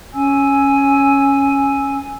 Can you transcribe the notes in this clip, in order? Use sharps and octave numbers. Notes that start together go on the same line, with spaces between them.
C#4 G#5 E6